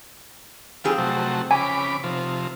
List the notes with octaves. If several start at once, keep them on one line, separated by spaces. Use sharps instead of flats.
F2 C4 F4 G#4
C3 F#3 A3
C#3 G#5 B5 D6
C3 F3